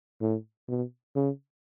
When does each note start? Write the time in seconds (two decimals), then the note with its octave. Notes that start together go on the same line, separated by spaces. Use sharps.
0.21 A2
0.68 B2
1.15 C#3